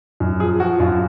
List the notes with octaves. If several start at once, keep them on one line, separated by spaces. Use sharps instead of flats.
F#2
F3 G#4
F3 F#4
F#2 F4